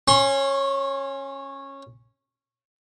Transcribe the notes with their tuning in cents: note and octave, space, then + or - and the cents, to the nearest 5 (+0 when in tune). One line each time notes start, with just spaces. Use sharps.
C#4 -15 C6 +40